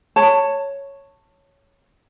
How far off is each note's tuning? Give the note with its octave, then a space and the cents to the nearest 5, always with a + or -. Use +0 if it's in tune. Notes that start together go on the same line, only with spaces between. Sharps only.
C#5 +0 A5 +20